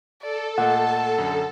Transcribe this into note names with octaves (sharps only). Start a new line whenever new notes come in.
A4 D5
A#2 A3 D#5 F#5 A5
F#2 D3